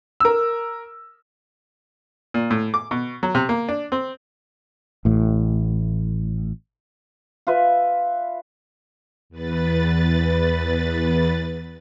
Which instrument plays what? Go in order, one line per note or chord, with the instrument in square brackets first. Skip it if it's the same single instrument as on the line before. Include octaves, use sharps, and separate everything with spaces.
[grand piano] A#4 E6
[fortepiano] A#2
A2
D6
B2
F#3
C3
A#3
D4
C4
[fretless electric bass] A1 A2
[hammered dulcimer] F4 B4 E5
[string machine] E2 B4 A6